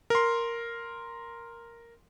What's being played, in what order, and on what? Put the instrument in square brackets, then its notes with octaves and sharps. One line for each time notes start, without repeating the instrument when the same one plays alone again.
[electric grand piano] A#4 C6